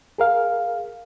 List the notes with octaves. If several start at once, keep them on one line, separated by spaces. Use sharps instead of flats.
G#4 A#4 F5